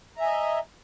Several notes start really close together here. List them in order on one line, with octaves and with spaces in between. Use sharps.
A#5 E5 G#5 D#5